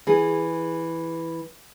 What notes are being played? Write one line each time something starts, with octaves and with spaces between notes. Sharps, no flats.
E3 G#4